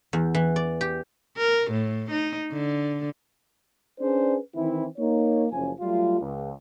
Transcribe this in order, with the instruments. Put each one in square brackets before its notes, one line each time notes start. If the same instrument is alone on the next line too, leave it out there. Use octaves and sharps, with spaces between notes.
[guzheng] E2
E3
D5
G4
[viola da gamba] A#4
A2
D#4
D3
[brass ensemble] C#4 D4 G#4 B4 C5 D5
D#3 E3 C4 E4
A#3 D#4 C#5
F#1 F3 C#4 G#5
F#3 G3 A3 F4
C#2